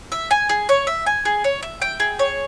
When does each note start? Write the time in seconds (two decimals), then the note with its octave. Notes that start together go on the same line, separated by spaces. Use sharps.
0.12 E5
0.31 G#5
0.49 G#4
0.69 C#5
0.87 E5
1.06 G#5
1.25 G#4
1.44 C#5
1.63 E5
1.82 G5
2.00 G#4
2.19 C#5